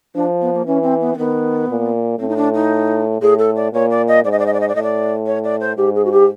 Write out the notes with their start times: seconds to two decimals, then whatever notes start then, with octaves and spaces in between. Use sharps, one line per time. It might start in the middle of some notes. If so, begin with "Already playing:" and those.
0.14 F3 D4
0.41 B3
0.53 A#3
0.66 E3 C#4
0.83 C4
1.00 B3
1.13 C4
1.17 D#3 B3
1.68 A#2
2.19 A2 C4
2.28 D#4
2.36 D4
2.54 D#4
3.21 A2 G#4
3.38 A4
3.55 D5
3.72 A#2 C#5
3.90 D5
4.07 D#5
4.24 G#2 D5
4.31 D#5
4.39 D5
4.46 D#5
4.53 D5
4.60 D#5
4.68 D5
4.75 A2 D#5
4.82 D5
5.26 C#5
5.43 D5
5.60 C5
5.77 G#2 G4
5.95 G#4
6.05 F#4
6.12 G4